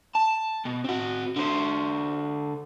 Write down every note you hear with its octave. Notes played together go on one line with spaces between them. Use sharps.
A5
B2
C4 F#4
D3 C5